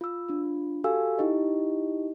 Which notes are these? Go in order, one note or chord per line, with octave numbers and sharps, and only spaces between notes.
F4 E6
D4 F4
F#4 G4 A4 F5 G#5 E6
D#4 E4 G4 D#5